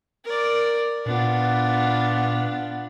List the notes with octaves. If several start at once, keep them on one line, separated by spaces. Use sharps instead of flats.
A#4 D5
A#2 B3 D4 F4